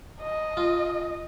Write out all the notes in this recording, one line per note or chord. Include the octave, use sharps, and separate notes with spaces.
D#5
F4